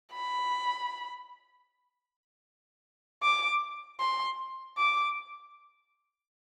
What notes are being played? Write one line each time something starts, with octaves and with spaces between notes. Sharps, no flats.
B5
D6
C6
D6